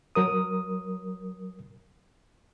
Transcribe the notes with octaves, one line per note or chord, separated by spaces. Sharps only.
F#3 A#4 D#6